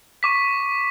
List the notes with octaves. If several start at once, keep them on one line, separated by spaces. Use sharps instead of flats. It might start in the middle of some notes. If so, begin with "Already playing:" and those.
C#6 D6 B6